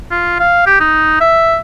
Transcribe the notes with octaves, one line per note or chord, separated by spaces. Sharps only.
F4
F5
G4
D#4
E5